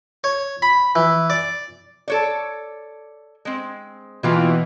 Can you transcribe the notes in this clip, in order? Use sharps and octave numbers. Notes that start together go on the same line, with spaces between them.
C#5
B5
E3
D5
A4 C#5 D5
G#3 C4
B2 E3 A#3 F4 G5